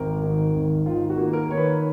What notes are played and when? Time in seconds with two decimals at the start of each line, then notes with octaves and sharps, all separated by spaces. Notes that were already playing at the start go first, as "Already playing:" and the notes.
Already playing: G#1 A#4
0.24 D#3
0.55 G#1
0.86 D#3 F4
1.10 F#4
1.18 A#3
1.33 A#4
1.49 D#3 C#5
1.57 B4